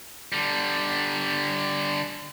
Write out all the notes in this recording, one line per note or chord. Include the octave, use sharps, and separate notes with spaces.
D3 G3